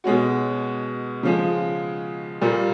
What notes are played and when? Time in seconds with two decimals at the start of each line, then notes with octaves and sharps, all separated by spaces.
0.04 B2 G#3 C#4 F#4
1.23 C#3 F3 G#3
2.41 A#2 G3 A#3